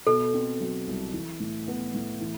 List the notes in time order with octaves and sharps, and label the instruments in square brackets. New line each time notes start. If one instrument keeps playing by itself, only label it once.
[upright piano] B2 [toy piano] A4
[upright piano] C4
F#3
C2
E3
A2
B3
A2
E3